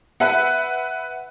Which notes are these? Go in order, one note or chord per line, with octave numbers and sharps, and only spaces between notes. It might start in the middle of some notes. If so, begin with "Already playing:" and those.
B4 E5 F#5